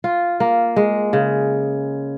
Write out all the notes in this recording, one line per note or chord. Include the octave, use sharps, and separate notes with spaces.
F4
A#3
G#3
C#3